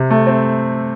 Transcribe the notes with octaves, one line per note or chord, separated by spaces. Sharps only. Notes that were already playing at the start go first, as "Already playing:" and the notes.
Already playing: C3
A3
C4